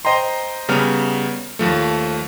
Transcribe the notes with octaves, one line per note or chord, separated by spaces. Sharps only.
C5 D#5 G5 A#5 C6
C#3 G3 B3 A#5 F6
D#2 F3 A3